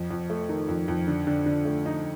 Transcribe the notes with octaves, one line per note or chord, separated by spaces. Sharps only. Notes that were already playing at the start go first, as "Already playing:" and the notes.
Already playing: F2
F2
A3
D#3
F2
F2
D3
D3
D3
A3
D#4